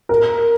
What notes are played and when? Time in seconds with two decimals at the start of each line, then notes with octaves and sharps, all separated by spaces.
0.09 A#4